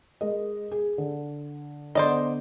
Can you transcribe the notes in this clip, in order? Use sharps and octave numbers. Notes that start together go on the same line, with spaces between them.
G#3 A#4 D#5
G#4
D3
D3 B3 C5 D5 D#5